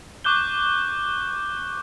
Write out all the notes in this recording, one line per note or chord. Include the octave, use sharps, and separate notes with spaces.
C#6 D6 F#6 G6 G7